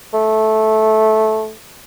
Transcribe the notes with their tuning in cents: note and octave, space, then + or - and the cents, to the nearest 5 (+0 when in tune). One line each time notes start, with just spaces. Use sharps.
A3 -10